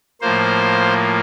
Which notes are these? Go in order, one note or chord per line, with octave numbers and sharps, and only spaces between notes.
A2 F3 A#3 C5